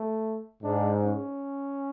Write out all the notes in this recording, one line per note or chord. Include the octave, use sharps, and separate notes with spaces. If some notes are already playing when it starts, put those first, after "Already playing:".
Already playing: A3
G#2 D4
C#4